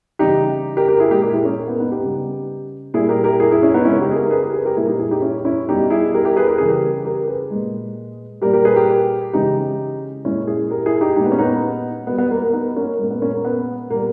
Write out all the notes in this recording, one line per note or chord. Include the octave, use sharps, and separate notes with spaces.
C#3 E3 G3 D#4 G4
G4 A#4
G4 A#4
E4 G#4
A#2 G#3 G4 A#4
G4 A#4
E4 G#4
A#3 C#4
A#3
B3
B3 D#4
D#4 G4
C#3 G3
A#2 G3 E4 G#4
G4 A#4
G4 A#4
E4 G#4
E4 G#4
C#4 E4
B3 D#4
C#3 G#3 C#4 E4
D#4 G4
G#4
G4 A#4
A#4
G#4 B4
G4 A#4
G#4 B4
G4 A#4
A#2 G3 E4 G#4
D#4 G4
E4 G#4
D#4 G4
C#4 E4
C#4 E4
B2 G3 D#4 G4
E4 G#4
G4 A#4
G4 A#4
G#4 B4
A#4
C#3 E3 G3 G#4
G4 A#4
G4 A#4
G#4 B4
A#2 G#3
A#2 G3 G4 A#4
G4 A#4
G#4 B4
G4 A#4
C#3 E3 G#3 D#4 G4
A#2 G#3 C#4 E4
E4 G#4
G4 A#4
E4 G#4
D#4 G4
A#2 G#3 D#4 G4
B3
C#4
B3 D#4
B2 G3 B3
B3
A#3
A#3
B3 D#4
A#3 C#4
A#2 G#3 A#3
B3
A#3 C#4
A#3
B3
A#2 G3 A#3